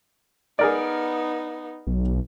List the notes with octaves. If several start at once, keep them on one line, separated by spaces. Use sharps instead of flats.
B3 D#4 G#4 A#4 D5
B1